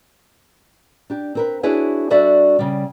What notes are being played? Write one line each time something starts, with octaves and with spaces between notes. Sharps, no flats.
D4 G4
C4 A#4 B4
D4 E4 F#4 G#4 B4 C#5
G3 D4 F#4 A4 D5 E5
C#3 G3